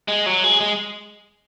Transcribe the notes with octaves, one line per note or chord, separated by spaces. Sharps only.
G#3
F#3
G#3
G#3